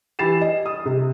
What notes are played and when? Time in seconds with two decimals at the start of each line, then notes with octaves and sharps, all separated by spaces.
0.19 E3 E4 G4 A6 C7 E7
0.41 D#5
0.66 D#6
0.85 C3